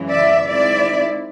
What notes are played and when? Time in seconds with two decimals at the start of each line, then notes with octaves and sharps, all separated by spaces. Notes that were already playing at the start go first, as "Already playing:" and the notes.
Already playing: F#2 C#3 E3 G#3
0.10 D5 E5
0.47 D#3 G#3 C4 E4 D5 E5